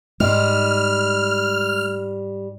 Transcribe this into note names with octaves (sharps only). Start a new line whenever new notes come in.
G#2 G3 G#3 C6 F6